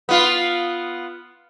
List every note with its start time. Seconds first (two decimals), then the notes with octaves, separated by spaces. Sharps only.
0.09 B3 F4